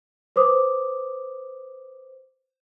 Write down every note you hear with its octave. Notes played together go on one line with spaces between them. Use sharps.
B4 C5 D6 D#6